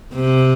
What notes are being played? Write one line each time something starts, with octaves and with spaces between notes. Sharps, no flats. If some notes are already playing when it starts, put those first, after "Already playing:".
C3